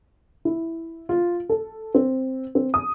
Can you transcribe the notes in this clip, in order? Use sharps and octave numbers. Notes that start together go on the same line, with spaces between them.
E4
F4
A4
C4
C4
D#6